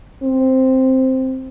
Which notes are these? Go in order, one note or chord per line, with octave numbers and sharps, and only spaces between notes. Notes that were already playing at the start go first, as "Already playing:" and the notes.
C4